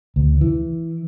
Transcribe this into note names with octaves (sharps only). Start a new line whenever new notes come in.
D2
E3